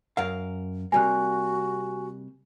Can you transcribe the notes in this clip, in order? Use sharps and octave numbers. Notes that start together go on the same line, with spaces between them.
F#2 A#4 F5
C3 G3 A#3 F#4 G#5 F#6